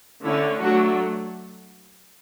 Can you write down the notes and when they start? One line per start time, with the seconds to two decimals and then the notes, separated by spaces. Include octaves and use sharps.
0.24 D3 A3 C#4 E4
0.61 F#3 A3 D4 F#4